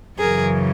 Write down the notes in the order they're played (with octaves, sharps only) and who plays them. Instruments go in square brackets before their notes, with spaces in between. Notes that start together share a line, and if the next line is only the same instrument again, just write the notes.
[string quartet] F#2 C#3 E3 G#4 A#4